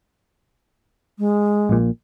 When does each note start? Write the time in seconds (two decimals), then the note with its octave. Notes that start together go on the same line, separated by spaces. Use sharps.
1.19 G#3
1.69 A#1 A#2